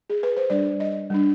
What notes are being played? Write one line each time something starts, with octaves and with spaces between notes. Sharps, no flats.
G#4
B4
C5
G3 D4 D5
D#5
G3 D4